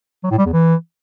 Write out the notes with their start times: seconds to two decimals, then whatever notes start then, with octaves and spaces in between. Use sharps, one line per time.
0.24 F#3
0.31 A2
0.38 G3
0.46 E2
0.53 E3